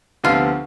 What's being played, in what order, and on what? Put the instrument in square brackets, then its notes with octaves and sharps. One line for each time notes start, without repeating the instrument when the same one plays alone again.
[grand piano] D2 C3 F3 B3 [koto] F4